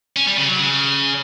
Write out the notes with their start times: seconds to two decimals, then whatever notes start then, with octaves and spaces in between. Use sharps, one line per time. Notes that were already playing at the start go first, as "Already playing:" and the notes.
0.16 C#4
0.27 G3
0.38 C#3
0.48 F#3
0.59 C#3